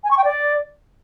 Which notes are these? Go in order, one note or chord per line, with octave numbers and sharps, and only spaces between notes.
G#5
C#6
G5
D5